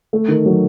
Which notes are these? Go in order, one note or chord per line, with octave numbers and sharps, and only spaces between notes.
A3
D#3
F#3